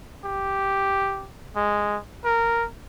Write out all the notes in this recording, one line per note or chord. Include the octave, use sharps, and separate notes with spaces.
G4
G#3
A#4